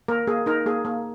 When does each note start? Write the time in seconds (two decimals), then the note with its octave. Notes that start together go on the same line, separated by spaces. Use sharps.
0.08 A#3 A#4
0.27 A#3 G#4
0.46 D#4 A#4
0.66 A#3 G#4
0.85 A#3